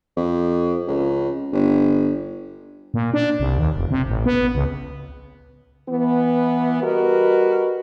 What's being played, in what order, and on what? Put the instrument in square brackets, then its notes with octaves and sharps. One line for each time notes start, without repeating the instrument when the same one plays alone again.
[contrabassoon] F2
C#2
G1
[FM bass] A#2
D4
C2
D#2
F1
C3
A1
B3
C#2
[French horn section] E3 B3
G3 F#4 A#4 B4 D#5